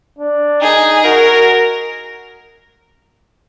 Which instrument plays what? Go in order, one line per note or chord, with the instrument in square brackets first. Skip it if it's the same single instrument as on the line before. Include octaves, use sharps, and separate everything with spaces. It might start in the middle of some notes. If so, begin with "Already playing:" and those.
[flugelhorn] D4
[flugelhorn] D#4 [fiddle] G#4
[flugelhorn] F#4 [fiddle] A#4